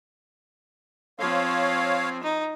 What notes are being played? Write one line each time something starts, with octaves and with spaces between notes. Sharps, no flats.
F3 C4 C#5 F5
D#4